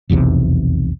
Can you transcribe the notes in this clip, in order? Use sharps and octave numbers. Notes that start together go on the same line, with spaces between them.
F1 B1 E2 C3